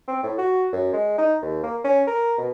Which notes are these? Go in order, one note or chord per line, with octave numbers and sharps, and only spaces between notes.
C4
A2
F#4
F#2
G#3
D#4
D#2
A#3
C#4
A#4
B2